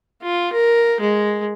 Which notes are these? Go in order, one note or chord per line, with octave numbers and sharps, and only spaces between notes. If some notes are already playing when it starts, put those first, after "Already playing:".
F4
A#4
G#3